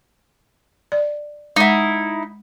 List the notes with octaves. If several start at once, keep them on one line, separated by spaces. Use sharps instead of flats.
D5
G#3 D#4 E4 F#5